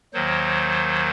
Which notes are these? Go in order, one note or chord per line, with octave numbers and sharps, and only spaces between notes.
D#2 D#3 F#3 C5